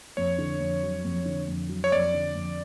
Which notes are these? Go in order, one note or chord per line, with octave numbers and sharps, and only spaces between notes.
F2 C#5
D3
F2
F#3
F2
D3
F2
F#3
C#5
F2 D5
D3
F2